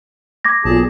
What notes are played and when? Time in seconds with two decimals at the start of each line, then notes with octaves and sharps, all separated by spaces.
0.45 D6 G#6 A#6
0.65 B1 A#2 G#4 A5